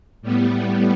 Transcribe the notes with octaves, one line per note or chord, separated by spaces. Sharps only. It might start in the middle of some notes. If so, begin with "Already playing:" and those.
A2 G3 B3